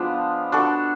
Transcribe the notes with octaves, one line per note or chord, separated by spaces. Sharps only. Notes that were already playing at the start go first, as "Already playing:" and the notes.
Already playing: F3 G#3 B3 D4
D4 F#4 A4